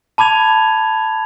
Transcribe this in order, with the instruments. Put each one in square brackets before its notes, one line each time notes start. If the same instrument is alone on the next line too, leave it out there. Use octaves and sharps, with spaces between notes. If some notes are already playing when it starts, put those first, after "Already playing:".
[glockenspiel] A5 B5 D6 G#6 F7